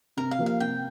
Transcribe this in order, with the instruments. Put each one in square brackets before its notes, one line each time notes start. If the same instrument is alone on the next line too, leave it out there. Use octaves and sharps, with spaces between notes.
[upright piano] C3 [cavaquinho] A#4
[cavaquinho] F5
[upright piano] F3 A#3 G4 A#4
[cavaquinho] F5
[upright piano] C3 [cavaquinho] G5